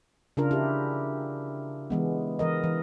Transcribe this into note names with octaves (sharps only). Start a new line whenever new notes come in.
C#3 D4 F4 A#4
E4 G4
E3 G#3 B3
E3 A#4 D#5
E3